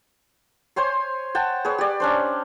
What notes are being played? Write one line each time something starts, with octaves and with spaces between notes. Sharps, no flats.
C5 C#5 G#5 C6
F#5 G5 A5
G#4 B4 C#5
G4 D5
C#4 D4 C5